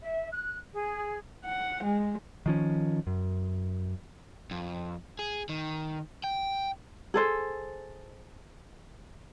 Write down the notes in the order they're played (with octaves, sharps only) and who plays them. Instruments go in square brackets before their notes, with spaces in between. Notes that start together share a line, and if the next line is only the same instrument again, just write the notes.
[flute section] E5
F#6
G#4
[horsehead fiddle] F#5
G#3
[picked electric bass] D#3 F3 C#4
F#2
[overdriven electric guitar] F2
G#4
D#3
G5
[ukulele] G#4 A4 C5